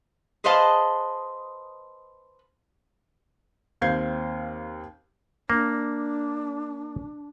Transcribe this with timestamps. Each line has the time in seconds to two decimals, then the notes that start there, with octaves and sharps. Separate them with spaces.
0.44 G#4 B4 C5 D#5 F5 A5
3.81 D#2 C4 F5 G6 G#6 C7
5.50 A#3 D4